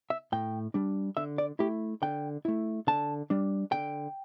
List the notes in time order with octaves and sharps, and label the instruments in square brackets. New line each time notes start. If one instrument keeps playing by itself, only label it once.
[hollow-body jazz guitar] E5
A2 G5
G3 D4
D3 E5
D5
A3 E4 G4
D3 G5
A3 E4
D3 A5
G3 D4
D3 G5